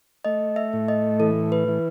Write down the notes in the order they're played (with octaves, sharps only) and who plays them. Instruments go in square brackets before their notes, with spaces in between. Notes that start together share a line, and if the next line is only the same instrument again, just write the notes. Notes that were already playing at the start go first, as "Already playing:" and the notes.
[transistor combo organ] A3 [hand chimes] D#5
[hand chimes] E5
[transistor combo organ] A2
[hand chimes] D#5
[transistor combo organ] E3 [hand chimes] A4
[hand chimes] B4
[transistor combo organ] E3